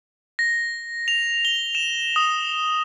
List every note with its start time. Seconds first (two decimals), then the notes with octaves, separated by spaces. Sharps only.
0.39 A#6
1.08 F7
1.45 G7
1.75 E7
2.16 D#6